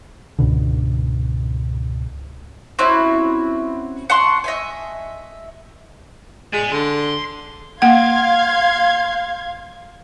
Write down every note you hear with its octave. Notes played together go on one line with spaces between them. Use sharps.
C#2 G#2 B2 D3
C4 C#4 E4 F#4
F#5 A5 C6 C#6
D#5 E5 G#5
G#3 D5 G#5
D3 C6
A#3 F5 F#5 C6 G#6